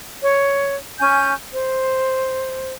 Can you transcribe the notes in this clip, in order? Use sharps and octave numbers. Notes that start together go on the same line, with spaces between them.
C#5
C#4 G#5 G6
C5